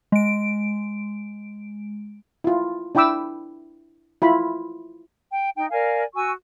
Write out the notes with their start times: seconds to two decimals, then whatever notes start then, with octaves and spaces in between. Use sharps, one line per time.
0.12 G#3 D7
2.44 E4 F4
2.95 D4 E4 G5 B5 D6 E6
4.22 E4 F4 B5
5.32 G5
5.57 D#4 G5
5.71 A#4 D5 F5 G#5
6.15 F#4 G#5 C#6 E6